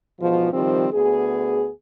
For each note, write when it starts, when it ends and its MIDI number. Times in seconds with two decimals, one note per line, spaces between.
0.20 0.50 40
0.20 0.50 44
0.20 0.50 47
0.20 0.50 53
0.52 0.87 48
0.52 0.87 51
0.52 0.87 53
0.52 0.87 55
0.52 0.87 60
0.93 1.69 38
0.93 1.69 59
0.93 1.69 68